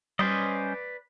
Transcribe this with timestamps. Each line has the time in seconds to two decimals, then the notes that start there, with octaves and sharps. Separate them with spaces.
0.19 G3 C#4 B4 C5 D5 D#5